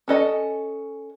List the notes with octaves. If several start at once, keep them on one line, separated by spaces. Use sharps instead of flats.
C#4 A4 D#5